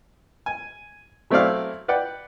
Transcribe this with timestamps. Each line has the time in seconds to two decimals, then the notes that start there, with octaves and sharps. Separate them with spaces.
0.46 G#5
1.30 F#3 A3 C4 E4 D5 F5
1.88 B4 D5 F#5 G5